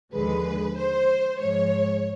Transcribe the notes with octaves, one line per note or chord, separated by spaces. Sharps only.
D#2 D3 F3 G#3 B4
C5
G#2 F3 G#3 C#5